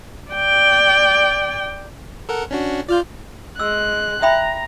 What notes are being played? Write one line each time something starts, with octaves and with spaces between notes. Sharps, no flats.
D5 G5
A4 A#4 F#5
C#4 D4 F#4
F4 D5 F6 G6
G#3 E6 F#6
E5 G5 A#5 B5